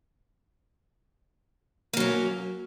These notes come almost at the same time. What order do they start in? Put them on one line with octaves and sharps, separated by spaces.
A#3 F#3 C#4